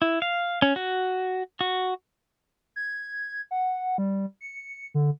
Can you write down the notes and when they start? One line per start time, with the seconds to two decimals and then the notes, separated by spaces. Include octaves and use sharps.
0.02 E4
0.22 F5
0.62 C#4
0.76 F#4
1.61 F#4
2.76 G#6
3.51 F#5
3.98 G3
4.41 C#7
4.94 D3